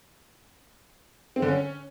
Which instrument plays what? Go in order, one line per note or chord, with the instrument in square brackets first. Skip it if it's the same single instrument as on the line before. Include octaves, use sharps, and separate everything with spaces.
[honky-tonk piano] C4
D3
C#4